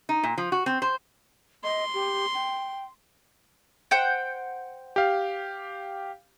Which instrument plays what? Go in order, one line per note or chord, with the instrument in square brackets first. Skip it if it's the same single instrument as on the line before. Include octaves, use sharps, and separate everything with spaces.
[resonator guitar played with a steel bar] D#4
A#2
F3
F#4
C4
C5
[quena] D#5 [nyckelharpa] C6
[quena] G4
G5
[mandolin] C5 F#5 G5
[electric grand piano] G4 F5